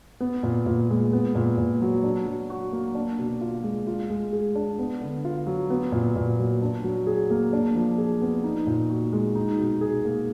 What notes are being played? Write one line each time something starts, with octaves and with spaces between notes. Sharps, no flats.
B3
A#2
A#2
G#3
B3
A#2
A#2
F#3
D4
F#3
F#4
A#3
D4
B2
F4
G#3
F4
G#3
G#4
D4
B3
D3
F4
F#3
B3
A#2
A#2
F#3
D4
F#3
G#4
A#3
D4
F3
G#4
B3
D#4
A#2
F#4
G#3
D#4
B2
G#4
A#3